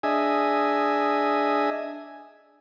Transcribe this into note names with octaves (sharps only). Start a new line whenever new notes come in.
D4 G#4 D#5 E5 G#5